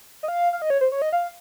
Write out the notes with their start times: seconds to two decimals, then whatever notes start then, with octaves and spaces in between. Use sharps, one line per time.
0.23 D#5
0.28 F5
0.53 F5
0.62 D#5
0.70 C#5
0.81 C5
0.92 C#5
1.02 D#5
1.13 F5